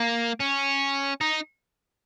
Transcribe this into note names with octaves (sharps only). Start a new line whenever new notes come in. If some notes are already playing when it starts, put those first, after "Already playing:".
Already playing: A#3
C#4
D#4